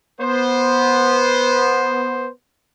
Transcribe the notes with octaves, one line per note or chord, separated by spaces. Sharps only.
B3 C5